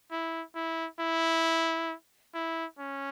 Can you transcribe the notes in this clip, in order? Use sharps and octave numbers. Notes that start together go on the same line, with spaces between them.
E4
E4
E4
E4
C#4